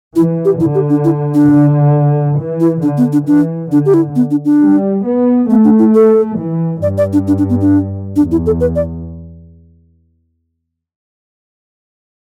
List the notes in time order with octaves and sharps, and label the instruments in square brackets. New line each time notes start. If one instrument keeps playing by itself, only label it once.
[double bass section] E3 [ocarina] E4
[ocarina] G4
[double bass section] D3 [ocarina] E4
[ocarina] G4
D4
E4
D4
[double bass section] D3
E3
[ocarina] E4
[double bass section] D3 [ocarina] D4
[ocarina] B3
D4
[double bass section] E3 [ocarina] D4
[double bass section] D3 [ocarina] D4
[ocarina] G4
E4
B3
D4
D4
[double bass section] G3
B3
[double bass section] A3 [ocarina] B3
[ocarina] D4
E4
A4
[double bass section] E3
[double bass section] G2 [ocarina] D5
[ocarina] D5
D4
D4
D4
B3
D4
[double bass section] E2 [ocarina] D4
[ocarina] E4
A4
B4
D5